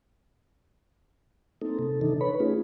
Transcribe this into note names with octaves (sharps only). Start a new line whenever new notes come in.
A#3 C4 D#4 A4
C3 A4
C3 D#3 E3 D4 D#4 A4
B4 C#5 B5
A3 C#4 D#4 F4 G#4